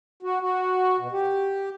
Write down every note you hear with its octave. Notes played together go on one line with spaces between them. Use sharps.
F#4
F#4
B2
G4